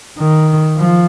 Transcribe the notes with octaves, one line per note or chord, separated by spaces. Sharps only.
D#3
F3